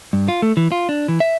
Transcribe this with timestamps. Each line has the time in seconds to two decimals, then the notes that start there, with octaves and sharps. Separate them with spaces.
0.13 G2
0.28 F4
0.42 A3
0.57 E3
0.72 F4
0.89 D4
1.08 E3
1.20 E5